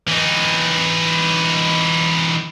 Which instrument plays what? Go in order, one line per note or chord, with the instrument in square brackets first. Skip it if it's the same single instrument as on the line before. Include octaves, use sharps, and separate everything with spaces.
[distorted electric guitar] E3 D#4